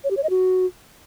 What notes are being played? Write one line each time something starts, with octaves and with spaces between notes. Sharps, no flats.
C#5
G4
C#5
D#5
F#4